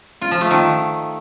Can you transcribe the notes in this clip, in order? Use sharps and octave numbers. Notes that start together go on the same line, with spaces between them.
F4
F3
A3
D#3